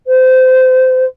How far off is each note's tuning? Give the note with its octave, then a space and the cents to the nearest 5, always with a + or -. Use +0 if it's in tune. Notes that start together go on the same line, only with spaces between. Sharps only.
C5 -25